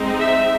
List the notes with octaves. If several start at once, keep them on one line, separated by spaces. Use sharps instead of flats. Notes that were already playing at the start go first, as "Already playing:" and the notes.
Already playing: G#3 C4 D#4
E5